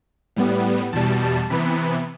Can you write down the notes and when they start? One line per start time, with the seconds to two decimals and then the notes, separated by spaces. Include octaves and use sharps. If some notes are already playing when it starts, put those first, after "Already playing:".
0.36 A2 G3 B3
0.93 E2 B2 G3 A5
1.22 A5
1.50 C3 E3 B3 B5